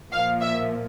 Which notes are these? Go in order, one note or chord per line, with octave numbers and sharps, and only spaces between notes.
A#2 F3 A#3 F5
E5